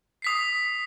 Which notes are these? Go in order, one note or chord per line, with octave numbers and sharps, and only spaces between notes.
D#6 B6 C7